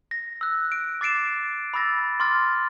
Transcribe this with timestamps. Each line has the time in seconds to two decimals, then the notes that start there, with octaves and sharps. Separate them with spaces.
0.11 A#6
0.41 E6 F#6
0.72 D7
1.01 D6 A6 C7 D7 E7
1.74 B5 D6 E6 A6 A#6
2.20 C6 D6 F6 A6